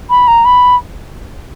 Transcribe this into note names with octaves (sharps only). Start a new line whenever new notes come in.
B5
A#5
B5